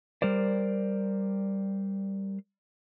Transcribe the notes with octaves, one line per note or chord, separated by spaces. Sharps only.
G3 A#4 C5 D5